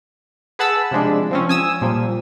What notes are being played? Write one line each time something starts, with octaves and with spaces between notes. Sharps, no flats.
G#4 B4 F#5 A5 B5 E6
C3 F3 G#3 D4
F3 C4 C#4
G#5 D#6 E6
A#2 F3 G3